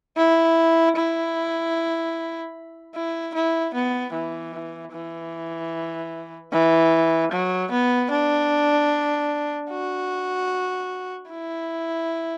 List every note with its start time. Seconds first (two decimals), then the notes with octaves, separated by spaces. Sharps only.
0.17 E4
0.96 E4
2.94 E4
3.34 E4
3.74 B3
4.13 E3
4.93 E3
6.53 E3
7.31 F#3
7.71 B3
8.11 D4
9.70 F#4
11.29 E4